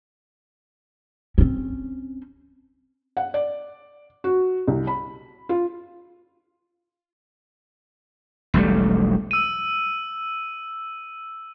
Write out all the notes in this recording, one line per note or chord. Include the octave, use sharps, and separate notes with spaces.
C4 C#4
F#5
D5
F#4
C2
B5
F4
E1 B1 G3 A3
E6 D#7